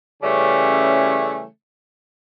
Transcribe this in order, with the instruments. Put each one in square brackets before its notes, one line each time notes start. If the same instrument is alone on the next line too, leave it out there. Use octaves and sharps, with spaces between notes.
[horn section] C#3 E3 G3 A3 C#4